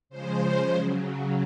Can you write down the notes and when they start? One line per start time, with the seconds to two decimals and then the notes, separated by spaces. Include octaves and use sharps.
0.09 C#3 F3 G#3 C5
0.74 C#3 F#3